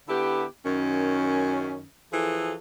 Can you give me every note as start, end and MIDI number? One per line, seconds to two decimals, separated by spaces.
0.08 0.43 50
0.08 0.43 59
0.08 0.43 64
0.08 0.43 67
0.64 1.83 42
0.64 1.83 51
0.64 1.83 61
2.12 2.53 52
2.12 2.53 53
2.12 2.53 68
2.12 2.53 69